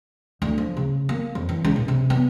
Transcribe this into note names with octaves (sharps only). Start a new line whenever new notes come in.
D2
F3
C#3
A#3
F2
E3
C#2
A#2
C3
B3